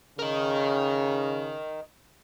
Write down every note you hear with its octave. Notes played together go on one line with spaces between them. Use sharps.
C#3 A#4 D#5